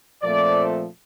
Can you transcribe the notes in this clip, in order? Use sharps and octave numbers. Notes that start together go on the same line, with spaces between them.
A#2 F3 A3 C4 D5